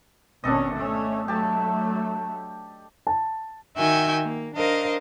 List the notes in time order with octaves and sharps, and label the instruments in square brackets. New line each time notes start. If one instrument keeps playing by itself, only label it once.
[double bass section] G#1 B2 C#4 [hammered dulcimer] D4 A4 D#5
[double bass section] A3 C#4
[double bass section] F#3 A3 [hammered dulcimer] G4 A5
[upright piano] A5
[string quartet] D#3 F#4 E5 G5 G#5 G6
A#3
D4 A#4 C5 D#5 F5